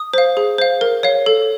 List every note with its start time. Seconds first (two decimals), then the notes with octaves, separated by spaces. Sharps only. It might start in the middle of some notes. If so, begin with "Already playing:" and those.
Already playing: D#6
0.14 C5 F5
0.37 G#4
0.58 C5 F5
0.81 A#4
1.03 C#5 F5
1.26 A4